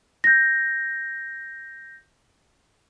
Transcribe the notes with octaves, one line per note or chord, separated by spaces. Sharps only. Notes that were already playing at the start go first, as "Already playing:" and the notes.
G6 A#6